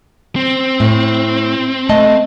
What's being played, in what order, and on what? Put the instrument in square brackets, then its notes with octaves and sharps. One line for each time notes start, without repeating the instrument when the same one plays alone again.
[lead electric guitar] C4
[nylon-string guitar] A2
A3 D#5 A5